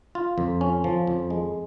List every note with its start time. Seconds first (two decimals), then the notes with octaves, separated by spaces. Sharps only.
0.15 F4
0.38 F2
0.61 C#4
0.84 F3
1.07 F2
1.30 G#3